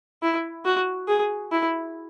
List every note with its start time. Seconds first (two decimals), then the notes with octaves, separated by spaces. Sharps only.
0.22 E4
0.65 F#4
1.08 G#4
1.52 E4